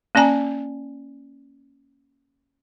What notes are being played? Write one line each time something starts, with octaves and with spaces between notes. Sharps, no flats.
A#3 C#4 D5 G#5 A#5